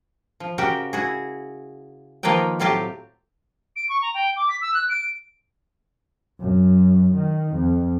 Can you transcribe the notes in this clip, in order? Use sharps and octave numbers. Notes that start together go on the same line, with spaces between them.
F3
C#3 F#4 G4 A#4 G5
E4 F#4 G#4
D#3 F3 A#3 F4 B4 G5
A2 F#3 C4 F4 G4 A5
D7
C#6
A#5
G5
D6
B6
E6
F#6
D7
F#2
D#3
F2